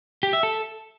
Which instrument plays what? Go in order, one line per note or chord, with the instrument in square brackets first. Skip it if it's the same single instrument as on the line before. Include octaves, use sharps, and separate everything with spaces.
[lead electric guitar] G4
E5
A4